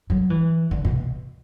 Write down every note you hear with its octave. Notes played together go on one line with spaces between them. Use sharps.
F#3
E3
D3
B2